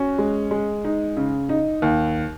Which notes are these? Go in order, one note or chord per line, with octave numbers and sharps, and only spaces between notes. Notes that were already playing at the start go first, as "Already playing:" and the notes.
Already playing: C#4 F#4
G#3
G#3
D#4
C#3
D#4
D#2